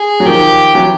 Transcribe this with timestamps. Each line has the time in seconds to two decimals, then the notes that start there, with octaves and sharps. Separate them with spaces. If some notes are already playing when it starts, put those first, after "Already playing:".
Already playing: G#4
0.20 F#3
0.26 D#3 F3 G4
0.74 E3 F#3